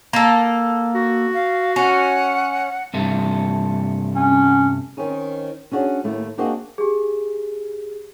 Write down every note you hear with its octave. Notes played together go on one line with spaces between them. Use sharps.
A#3 A4
F#4
F5
C#4 F#5
G2 C3 A3
C#4
D#3 C4 C#4 D#4
C#4 D4 F#4 G#4 C#5
D#2 A2 A3
A#3 C4 D4 F#4 G#4 D#5
G4 G#4